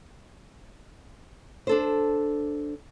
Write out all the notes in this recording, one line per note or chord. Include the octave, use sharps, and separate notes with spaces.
D4 A4 C5